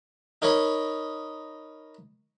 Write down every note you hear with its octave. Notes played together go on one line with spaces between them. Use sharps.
D#4 A#4 C#5 D#5 B5